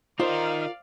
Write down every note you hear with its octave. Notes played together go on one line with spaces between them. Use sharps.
D#3 D#4 F4 A#4 C5 D5 F5